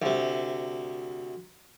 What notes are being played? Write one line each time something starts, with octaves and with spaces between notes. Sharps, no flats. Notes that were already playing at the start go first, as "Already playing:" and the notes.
D2 C3